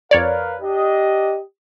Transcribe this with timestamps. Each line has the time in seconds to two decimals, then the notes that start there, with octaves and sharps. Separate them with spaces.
0.11 F2 A#4 B4 C#5 D5 F5
0.62 D4 G4 D#5